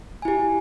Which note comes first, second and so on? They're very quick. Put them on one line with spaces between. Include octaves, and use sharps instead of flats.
G#5 E4 G4